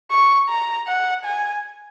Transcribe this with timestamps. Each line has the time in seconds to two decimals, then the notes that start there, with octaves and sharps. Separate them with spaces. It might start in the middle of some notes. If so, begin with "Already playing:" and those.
0.11 C#6
0.49 A#5
0.87 F#5
1.25 G#5